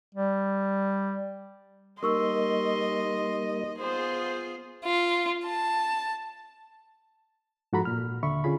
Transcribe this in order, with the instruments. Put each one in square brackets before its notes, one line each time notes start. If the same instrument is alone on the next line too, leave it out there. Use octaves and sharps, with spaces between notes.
[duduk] G3
[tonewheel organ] G3 A#3 D#4 [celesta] A#4 C#6 E6 [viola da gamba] D#5 [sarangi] C6
[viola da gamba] B3 F4 G#4 [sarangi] C5
[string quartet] F4
A5
[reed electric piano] G#2 F3 F#4 A4 A#5 B5
A#2 F6
D#2 D3 E5 B5 C#6
D3 C#4 F4 G#4 B5